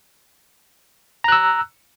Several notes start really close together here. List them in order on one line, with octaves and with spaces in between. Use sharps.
A#5 F#6 E6